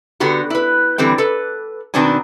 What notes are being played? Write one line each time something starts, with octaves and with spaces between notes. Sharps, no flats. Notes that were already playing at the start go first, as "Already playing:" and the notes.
D3 B3 F#4 G4
E4 B4
D3 E3 G3 C4 G5
A4 B4
B2 D#3 B3 C4 D4 G#5